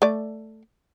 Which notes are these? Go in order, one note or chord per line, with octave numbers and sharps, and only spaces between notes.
A3 D5